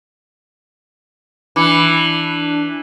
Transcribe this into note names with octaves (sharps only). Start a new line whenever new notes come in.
E3 D4 B5 D6 C#7